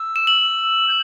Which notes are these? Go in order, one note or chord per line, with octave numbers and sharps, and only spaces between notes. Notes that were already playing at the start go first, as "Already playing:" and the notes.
Already playing: E6
E7
F#7
G6